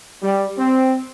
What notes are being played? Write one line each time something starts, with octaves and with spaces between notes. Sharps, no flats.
G3
C4